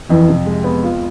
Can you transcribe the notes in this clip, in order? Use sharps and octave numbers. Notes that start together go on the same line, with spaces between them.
F2 E3
C3
G#3
B3
F4